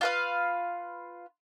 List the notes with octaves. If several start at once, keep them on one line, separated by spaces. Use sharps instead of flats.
F4 B4 F5